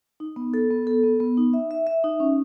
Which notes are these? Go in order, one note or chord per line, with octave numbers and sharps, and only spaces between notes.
D#4
B3
A4
B3
A4
B3
B3
D#4
E5
E5
E5
D#4
C#4